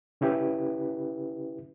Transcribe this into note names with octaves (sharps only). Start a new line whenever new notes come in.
C#3 C#4 E4 G4 B4